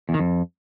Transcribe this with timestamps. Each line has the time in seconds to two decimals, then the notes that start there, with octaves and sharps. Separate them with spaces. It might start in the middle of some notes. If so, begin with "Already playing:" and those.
0.09 E2
0.14 D#3
0.20 F2